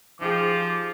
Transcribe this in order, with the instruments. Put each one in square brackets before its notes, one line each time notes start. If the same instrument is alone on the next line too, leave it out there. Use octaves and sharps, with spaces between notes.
[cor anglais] F3 [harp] D#4 G4 G#4 [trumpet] D6